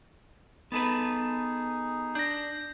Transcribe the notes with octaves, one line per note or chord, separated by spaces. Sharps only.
B3 D#4 G#4 A4 B4
D4 G6 A#6